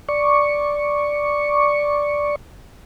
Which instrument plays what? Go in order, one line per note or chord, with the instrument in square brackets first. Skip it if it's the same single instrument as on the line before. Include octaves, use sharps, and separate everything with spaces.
[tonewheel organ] D5 C#6